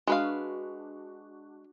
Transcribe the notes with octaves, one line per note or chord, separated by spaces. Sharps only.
G#3 D4 F#4 B4 F5